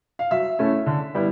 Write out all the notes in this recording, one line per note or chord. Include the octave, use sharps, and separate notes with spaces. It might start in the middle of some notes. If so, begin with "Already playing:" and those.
F5
F#3 E5
A3 C#4 E4
D3
G3 B3 E4